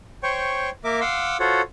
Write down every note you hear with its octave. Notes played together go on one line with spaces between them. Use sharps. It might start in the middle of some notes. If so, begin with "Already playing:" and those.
C5 C#5 G5 C#6
A#3 A#4 E5 D6
F5 F#5 C6 D6 E6
F4 F#4 A4 C5 C#5 F#5